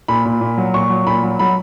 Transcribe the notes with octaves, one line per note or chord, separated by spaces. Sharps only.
A#2 B5
A#2
A#2
F#3
A#2 C#6
F#3
A#2 B5
F#3
F#3 B5